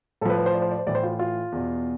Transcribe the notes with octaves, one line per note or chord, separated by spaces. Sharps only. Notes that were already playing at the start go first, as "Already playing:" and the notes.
A2 F3 A4 B4
B4
C5
D5
C5
D5
C5
A2 E3 D5
C5
F4
F4
E2 B2